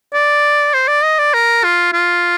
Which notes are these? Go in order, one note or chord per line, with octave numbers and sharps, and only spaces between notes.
D5
C5
D5
D#5
D5
A#4
F4
F4